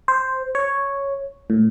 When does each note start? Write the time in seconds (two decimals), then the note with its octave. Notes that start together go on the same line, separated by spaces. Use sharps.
0.08 C5
0.55 C#5
1.50 A2